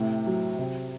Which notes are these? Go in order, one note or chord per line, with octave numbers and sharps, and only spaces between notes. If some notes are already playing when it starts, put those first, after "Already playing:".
Already playing: A2 C3
F#3
C3